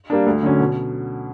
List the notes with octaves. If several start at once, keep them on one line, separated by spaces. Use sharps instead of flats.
G3 A#3 D4
D2
D3 F#3 C#4
B2